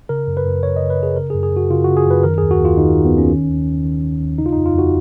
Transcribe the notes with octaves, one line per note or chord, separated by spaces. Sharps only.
C#3 A#4
F#2
B4
F#2
C#3 C#5
D#5
C#3
B4
F#2 G#4
C#3 A#4
G#4
F#2
G#4
F#2 F#4
C#3 F4
C#3 F#4
G#4
F#2 B4
D#3 A#4
D#2 G#4
F#4
D#2
F4
D#3 D#4
D#3
B3
D#2
C#4
D#3
D#2
D#2
D#3
D#3
D#2
C#3 D#4
F4
D#4
F2
F4
F2 F#4